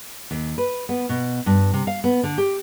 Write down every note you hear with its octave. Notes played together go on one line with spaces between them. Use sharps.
D#2
B4
B3
B2
G2
C3
F5
B3
D3
G4